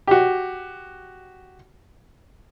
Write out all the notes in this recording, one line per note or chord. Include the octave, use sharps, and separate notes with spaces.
F#4 G4